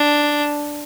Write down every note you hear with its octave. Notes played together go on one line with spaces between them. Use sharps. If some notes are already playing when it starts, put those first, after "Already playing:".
Already playing: D4